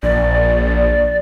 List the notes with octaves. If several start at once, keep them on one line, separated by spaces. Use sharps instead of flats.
A#1 D5